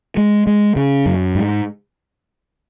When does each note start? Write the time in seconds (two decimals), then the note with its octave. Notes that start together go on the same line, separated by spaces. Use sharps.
0.17 G#3
0.47 G#3
0.76 C#3
1.06 F#2
1.35 G#2